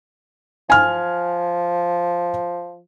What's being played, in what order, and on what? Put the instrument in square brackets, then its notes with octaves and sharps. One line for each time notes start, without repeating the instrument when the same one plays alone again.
[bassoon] F3 [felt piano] G#5 F6